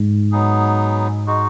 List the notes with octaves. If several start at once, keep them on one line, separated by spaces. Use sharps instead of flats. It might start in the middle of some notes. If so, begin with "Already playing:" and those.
Already playing: G#2
F#3 B3 D#4 G#4
G#3 D#4 F#4